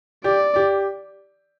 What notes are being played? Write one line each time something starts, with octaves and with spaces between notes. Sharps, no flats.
G4 D5
G4